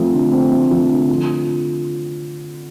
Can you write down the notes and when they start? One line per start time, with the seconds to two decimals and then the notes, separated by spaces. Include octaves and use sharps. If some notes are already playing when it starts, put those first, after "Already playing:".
Already playing: F3 A3 C4
0.13 D3
0.32 C4
0.52 A3
0.71 F3
0.90 D3
1.09 F4